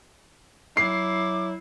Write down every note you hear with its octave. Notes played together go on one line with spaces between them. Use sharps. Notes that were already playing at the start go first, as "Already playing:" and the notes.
F#3 E4 D6 C7